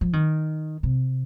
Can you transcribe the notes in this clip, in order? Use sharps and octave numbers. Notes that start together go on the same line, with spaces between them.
F3
D#3
C3